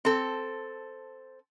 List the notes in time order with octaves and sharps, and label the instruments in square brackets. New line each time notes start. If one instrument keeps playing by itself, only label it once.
[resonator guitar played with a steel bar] C4 A4